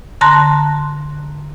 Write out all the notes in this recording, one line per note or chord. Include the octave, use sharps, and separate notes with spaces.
D3 A5 A#5 C6 F#6 A#6